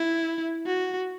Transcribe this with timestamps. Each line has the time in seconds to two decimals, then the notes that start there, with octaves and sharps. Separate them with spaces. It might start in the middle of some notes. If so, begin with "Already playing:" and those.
Already playing: E4
0.66 F#4